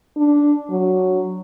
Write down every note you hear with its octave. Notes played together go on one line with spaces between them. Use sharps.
D4
F#3